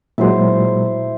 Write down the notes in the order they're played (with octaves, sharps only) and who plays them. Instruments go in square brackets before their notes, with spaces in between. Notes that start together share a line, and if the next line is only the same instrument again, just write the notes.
[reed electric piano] A#2 F#3 G#3 [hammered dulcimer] E4 C5